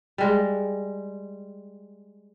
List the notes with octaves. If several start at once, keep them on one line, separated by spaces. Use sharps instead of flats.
G3 G#3